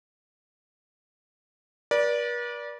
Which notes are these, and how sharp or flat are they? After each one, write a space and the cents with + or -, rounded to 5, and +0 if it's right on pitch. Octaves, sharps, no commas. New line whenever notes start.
B4 -45 D5 -10